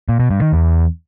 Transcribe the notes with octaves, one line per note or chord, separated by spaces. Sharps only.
A#2
B2
G2
D#3
E2